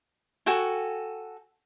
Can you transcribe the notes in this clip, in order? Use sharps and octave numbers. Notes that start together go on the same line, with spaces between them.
F#4 A4 G5 G#5